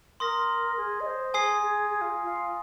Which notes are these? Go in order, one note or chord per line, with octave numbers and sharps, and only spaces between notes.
A#4 C6 D#6 A#6
G#4
D#5
C5
G#4 G#5 D#6 C7
G#4
G#4
F4
F4